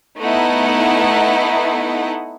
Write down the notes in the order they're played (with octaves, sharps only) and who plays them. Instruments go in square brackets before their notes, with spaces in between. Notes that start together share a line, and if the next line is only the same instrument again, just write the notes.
[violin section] A3 B3 D#4 E4 F#5